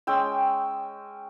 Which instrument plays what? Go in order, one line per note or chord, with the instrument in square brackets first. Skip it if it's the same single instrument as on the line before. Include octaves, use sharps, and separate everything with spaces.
[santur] G#3 C#4 G5 E6